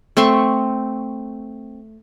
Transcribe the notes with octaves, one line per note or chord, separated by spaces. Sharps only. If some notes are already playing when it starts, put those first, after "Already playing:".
A3 C4 C6 C#6